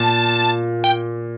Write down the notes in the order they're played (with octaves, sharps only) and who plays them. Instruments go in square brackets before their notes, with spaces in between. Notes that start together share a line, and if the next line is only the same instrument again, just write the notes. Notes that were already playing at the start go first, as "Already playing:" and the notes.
Already playing: [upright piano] A#2 [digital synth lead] A5
[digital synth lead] G5